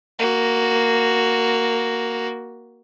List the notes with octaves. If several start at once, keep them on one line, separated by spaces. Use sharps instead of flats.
A#3 F#4